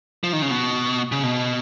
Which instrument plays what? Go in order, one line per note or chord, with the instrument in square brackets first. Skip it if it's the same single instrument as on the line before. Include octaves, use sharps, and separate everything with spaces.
[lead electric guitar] F3
D#3
C#3
B2
C#3
B2